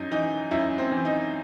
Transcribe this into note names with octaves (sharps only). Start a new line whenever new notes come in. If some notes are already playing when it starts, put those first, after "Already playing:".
Already playing: F#2 D#4
E3 D#4
F#2 E4
C4
E3
D#4